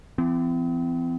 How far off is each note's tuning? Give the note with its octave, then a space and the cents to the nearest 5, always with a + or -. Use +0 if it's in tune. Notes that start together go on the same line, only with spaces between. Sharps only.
E3 +40 C4 -40